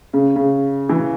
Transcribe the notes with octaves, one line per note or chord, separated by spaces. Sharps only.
C#3
C#3
E3